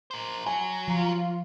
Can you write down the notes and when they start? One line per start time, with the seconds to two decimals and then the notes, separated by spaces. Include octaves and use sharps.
0.11 A#4 C5
0.46 F#3 G#5
0.88 F3 F4